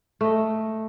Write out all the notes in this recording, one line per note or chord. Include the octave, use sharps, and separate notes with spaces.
A3 D#5